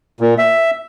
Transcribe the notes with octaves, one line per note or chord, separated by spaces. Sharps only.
A#2
E5